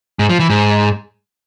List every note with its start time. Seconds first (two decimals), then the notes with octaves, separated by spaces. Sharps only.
0.19 G#2
0.29 F3
0.40 E3
0.50 G#2